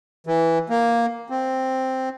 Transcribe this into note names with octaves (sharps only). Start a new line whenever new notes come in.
E3
A#3
C4